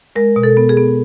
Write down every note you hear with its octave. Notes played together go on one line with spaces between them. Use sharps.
G#3 A#4
B2
A4
B3
G#4
B3